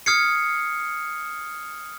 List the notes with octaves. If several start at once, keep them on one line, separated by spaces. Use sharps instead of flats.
D#6 F6 G#6 C7 C#7